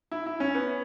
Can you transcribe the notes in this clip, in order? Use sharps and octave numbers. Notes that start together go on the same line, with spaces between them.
E4
E4
C#4
B3